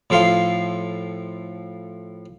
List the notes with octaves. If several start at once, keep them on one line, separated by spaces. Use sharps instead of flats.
A2 F3 A4 F5 C6